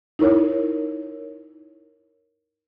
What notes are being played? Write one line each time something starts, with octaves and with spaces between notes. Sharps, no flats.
D#4 E4 A#4 C#5